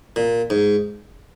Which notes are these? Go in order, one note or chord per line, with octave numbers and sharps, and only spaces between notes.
A#2
G#2